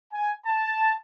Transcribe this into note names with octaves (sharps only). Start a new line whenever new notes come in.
G#5
A5